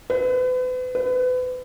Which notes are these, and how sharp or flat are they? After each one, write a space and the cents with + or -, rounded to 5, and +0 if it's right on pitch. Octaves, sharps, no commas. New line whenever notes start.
B4 +40
B4 +35